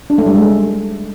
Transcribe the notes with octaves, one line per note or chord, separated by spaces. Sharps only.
D4
A3
G3
G#3